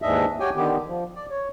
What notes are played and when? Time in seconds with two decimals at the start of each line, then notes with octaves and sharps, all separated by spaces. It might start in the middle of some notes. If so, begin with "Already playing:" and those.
0.02 D#2 G#2 E3 D4 D#5 E5
0.40 F#4 G4 C#5 G5 G#5
0.56 D3 D#3 B3 G4
0.87 F3
1.15 D5
1.30 C#5